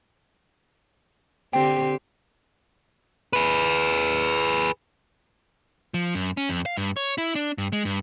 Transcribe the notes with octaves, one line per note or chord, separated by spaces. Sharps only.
D3 C4 G4 G5
G#4 B4
F3
F#2
C#4
F2
F5
G2
C#5
E4
D4
G2
G#3
G2